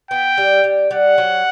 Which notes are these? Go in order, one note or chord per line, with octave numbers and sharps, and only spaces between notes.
B3 G5
G3
G3
G3 F#5
F#3